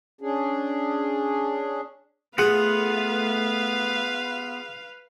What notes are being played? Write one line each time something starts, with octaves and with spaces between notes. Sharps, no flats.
C#4 D4 G#4
A3 B3 F4 G#4 B4 F5 F#5